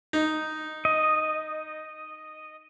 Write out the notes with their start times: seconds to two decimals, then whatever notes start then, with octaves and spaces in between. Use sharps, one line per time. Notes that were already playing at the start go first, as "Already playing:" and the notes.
0.13 D#4
0.85 D#5